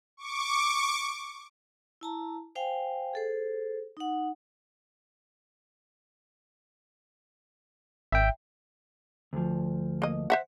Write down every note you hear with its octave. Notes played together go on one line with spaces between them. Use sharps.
C#6 D6
E4 A5 A#5
C5 F5 G5 G#5
G#4 A4 C5
D#4 F#5
G#1 E5 G5
D2 F3
A#3 D#5
C5 E5 F#5